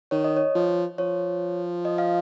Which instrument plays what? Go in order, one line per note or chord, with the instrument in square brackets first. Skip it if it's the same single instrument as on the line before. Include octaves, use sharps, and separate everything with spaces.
[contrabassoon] D#3 [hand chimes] C#5
[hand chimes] D#5
C#5
[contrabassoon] F3
[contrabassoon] F3 [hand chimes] C#5
[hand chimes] D#5
F5